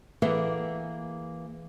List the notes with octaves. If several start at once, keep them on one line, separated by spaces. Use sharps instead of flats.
E3 A#3 G#4 A4 E5 F#5